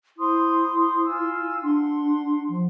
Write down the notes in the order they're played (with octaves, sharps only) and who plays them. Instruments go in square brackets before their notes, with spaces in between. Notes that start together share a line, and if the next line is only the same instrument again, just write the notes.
[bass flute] E4 [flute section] C5 C6 D#6
[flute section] F4 G#5 E6
[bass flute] D4 [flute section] F#5 C6
[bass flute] F3